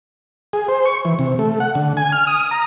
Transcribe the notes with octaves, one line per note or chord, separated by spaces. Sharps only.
G#4
C5
C#6
E3
C3
A3
F#5
D3
G#5
F6
D#6
A#5